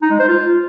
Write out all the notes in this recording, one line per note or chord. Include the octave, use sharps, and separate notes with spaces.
D#4
G#3
C5
F4